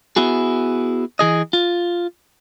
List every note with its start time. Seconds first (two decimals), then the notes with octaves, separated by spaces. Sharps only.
0.16 B3 E4 F#4 G#4
1.19 E3 G#4 D#5
1.53 F4